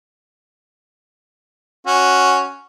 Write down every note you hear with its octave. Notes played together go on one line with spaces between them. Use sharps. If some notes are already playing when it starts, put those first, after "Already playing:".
C#4 F#4